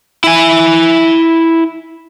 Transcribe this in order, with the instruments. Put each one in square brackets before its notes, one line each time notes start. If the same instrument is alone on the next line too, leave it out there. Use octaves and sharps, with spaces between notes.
[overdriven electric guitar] E4 G#5